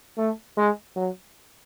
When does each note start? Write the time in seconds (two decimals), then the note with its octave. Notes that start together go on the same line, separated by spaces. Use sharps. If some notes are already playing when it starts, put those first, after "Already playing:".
0.17 A3
0.57 G#3
0.96 F#3